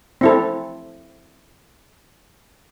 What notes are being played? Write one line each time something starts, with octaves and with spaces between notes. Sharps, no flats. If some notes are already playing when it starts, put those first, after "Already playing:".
C4 E4 A4